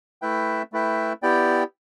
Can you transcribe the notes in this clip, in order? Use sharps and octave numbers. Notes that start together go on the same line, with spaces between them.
A3 E4 B4 E5 G5
A3 E4 B4 E5 G5
B3 E4 G4 D5 G5